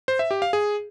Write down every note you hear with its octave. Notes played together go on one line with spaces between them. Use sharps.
C5
E5
G4
F5
G#4